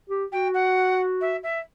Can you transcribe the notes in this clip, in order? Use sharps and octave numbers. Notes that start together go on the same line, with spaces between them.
G4
F#4 G5
F#5
E5
E5